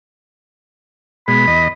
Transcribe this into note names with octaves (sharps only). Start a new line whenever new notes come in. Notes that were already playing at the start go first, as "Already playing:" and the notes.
B2 G#3 B5
E2 D#5